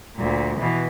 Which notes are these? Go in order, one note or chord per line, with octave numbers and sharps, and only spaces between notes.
D2 A#2
B2 E3